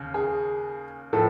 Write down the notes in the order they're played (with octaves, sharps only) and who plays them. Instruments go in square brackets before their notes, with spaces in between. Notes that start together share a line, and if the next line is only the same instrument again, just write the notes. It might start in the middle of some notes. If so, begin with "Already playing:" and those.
Already playing: [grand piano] D#2 C#3
[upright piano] G#4
[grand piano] A2 F3 [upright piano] A4